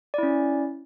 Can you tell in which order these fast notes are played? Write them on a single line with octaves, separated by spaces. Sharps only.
D5 E4 C#4